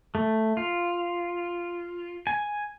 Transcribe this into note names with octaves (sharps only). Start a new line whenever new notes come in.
A3
F4
G#5